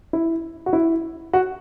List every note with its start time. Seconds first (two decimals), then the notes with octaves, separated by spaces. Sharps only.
0.13 E4
0.66 F#4
0.73 E4
1.33 F#4